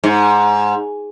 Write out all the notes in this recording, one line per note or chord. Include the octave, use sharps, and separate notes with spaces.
G#2